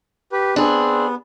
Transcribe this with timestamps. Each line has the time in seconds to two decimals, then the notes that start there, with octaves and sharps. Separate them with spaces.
0.32 G4 B4
0.56 B3 C4 D4 G#4